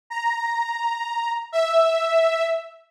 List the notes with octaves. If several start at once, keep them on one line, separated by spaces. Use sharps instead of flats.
A#5
E5